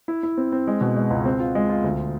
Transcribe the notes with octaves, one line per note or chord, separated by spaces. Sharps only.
E4
E4
C4
C4
G#3
B2
G#3
C#2
C4
F4
G#3
F4
D2